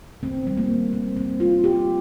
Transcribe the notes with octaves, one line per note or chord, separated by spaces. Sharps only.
D#3 C4
G3 C4
A#3
D#3
A#3 C4
D#3 C4
G3 F4
D#3 G4